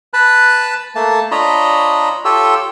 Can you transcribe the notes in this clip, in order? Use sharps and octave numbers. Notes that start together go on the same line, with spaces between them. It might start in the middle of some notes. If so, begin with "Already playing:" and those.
B4 A5 B5 F#6
A3 A#3 A5
D4 F4 C#5 D#5 A#5 B5
F4 G4 A4 C#5 E6